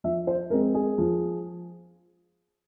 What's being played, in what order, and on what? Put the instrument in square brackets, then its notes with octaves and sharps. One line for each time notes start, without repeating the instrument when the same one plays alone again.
[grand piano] F3 E5
C5
G#3 C4 A#4
G#4
F3